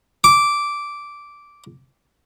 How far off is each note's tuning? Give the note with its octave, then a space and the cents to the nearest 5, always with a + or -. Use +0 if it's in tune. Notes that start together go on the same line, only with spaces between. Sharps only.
D6 -10